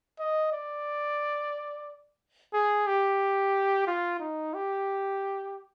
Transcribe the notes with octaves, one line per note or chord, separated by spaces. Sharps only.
D#5
D5
G#4
G4
F4
D#4
G4